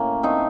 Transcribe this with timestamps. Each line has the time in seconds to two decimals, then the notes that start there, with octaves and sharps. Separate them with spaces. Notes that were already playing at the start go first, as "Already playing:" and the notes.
Already playing: A2 A#3 C#4
0.23 A3 C4 D#4